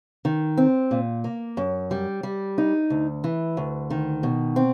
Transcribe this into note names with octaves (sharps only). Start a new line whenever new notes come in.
D#3
C4
A#2
A#3
F#2
G3
G3
D#4
D2
E3
D2
D#3
B2
C4